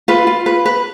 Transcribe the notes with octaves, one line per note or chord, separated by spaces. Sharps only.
F4 B4
F4
B4
B4